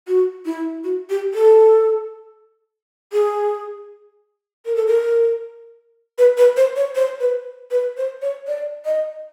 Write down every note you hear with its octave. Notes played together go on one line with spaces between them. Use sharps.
F#4
E4
F#4
G4
A4
G#4
A#4
A4
A#4
B4
B4
C5
C#5
C5
B4
B4
C5
C#5
D5
D#5